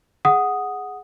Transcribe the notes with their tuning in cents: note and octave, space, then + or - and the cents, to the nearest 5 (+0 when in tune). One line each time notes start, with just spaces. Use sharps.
G#4 +0 F#5 +0 D#6 +0